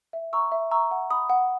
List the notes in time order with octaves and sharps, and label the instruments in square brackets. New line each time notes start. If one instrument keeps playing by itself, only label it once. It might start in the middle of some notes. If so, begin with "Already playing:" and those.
[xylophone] E5
A#5 C#6 E6
E5
A#5 C#6 E6
F#5
B5 D#6
F#5